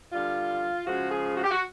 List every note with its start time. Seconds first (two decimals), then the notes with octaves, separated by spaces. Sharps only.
0.13 D3 G3 F4
0.87 C#3 F3 G#3 F#4
1.12 G#4
1.36 F#4
1.44 G4
1.51 F#4